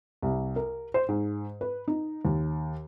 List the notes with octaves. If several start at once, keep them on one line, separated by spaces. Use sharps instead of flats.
C2
A#4
C5
G#2
B4
D#4
D#2